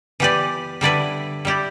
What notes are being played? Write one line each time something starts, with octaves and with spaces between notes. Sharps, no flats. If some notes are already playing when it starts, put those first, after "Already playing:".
E3 B3 G4 B4 D5
D3 G3 E4 B4 D5
G3 E4 G4 D5